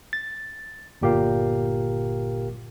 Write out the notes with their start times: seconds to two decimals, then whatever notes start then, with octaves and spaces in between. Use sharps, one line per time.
0.13 A6
1.01 G1 A#2 G4 A#4 F5